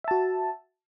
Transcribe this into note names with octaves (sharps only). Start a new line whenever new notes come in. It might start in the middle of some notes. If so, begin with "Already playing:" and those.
F#4 E5 A5